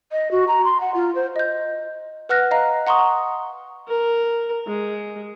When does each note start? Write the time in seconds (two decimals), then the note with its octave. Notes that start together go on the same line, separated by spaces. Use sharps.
0.12 D#5
0.31 F#4
0.48 A#5
0.65 C6
0.81 F#5
0.94 F4
1.15 C5
1.36 D#5 G6
2.29 B4 F#5 F6 F#6 A#6
2.51 D#5 F5 A#5
2.87 F#5 A#5 C6 C#6 D#6
3.88 A#4
4.67 G#3